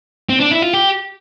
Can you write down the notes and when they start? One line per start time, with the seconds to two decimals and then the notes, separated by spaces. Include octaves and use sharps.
0.29 C4
0.40 D4
0.51 E4
0.62 F4
0.73 G4